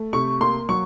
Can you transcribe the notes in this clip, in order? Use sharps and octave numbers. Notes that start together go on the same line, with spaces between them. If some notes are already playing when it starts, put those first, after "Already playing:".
Already playing: A3
C3 C#6
A#3 C6
F#3 C#6